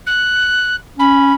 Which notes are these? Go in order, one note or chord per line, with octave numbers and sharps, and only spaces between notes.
F#6
C#4 B5